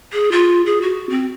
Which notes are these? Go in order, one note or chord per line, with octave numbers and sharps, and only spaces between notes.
G#4
F4
G#4
F#4
C4